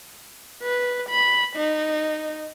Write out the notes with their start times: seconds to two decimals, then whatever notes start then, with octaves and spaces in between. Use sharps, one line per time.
0.63 B4
1.10 B5
1.56 D#4